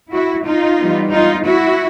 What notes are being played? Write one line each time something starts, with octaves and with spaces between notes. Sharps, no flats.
E4 F#4
D#4 F4
E3 G3 B3
D#4 F4
E4 F#4